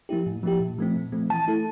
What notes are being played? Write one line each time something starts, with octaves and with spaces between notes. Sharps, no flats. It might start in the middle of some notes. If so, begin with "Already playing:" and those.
F3 A#3 E4 G4
A2
F3 A#3 E4 G4
A#2
F3 A3 C4
A#2
F3 A3 C4
E3 A5
A3 E4 A4